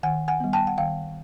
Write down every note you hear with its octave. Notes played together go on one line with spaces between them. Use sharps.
D#3 F#5 G#5
F#5 G#5
G3 B3
G5 A5
F#5
D#3 F5 G5